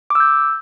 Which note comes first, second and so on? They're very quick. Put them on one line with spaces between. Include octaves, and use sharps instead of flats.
D6 E6 G6